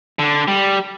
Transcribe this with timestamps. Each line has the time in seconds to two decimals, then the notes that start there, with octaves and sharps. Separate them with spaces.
0.19 D3
0.48 G3